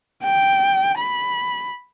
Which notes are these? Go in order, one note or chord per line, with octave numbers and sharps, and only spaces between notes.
G5
B5